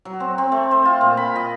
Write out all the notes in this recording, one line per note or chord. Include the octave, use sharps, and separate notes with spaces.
F#3
C4
C4
A3
C5
F4
A#2
B5
D#5